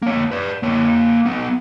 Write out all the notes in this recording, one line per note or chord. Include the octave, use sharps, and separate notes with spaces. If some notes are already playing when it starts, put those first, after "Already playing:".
A#3 C#5
B4 D5
A#3 C#5
F#3 B3